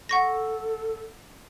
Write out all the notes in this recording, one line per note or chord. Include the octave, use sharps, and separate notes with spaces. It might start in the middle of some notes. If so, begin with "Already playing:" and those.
A4 F#5 C#6 A#6